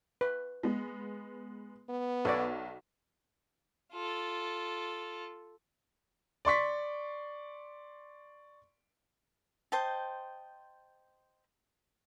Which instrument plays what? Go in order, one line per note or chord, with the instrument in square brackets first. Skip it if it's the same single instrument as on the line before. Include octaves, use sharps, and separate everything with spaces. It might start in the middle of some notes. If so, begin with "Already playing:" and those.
[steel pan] B4
[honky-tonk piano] G#3 B3
[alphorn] B3
[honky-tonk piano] B1 [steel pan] A4 C#5 D5
[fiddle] F4 A4
[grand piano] D5 C6 C#6 B6
[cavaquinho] C5 D#5 G5 A5